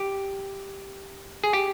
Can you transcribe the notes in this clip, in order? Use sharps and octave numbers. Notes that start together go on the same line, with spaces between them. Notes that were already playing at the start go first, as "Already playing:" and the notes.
Already playing: G4
G#4
G4